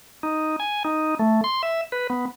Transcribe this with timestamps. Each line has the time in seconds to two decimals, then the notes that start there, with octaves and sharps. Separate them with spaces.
0.23 D#4
0.60 G#5
0.85 D#4
1.19 A3
1.44 C6
1.63 E5
1.92 B4
2.10 B3